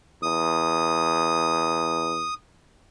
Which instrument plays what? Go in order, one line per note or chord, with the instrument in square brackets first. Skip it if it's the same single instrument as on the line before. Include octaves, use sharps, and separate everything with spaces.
[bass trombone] E2 [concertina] D#6